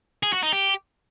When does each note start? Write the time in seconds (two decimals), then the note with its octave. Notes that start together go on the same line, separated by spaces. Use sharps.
0.23 G#4
0.33 F#4
0.43 D#4
0.53 G4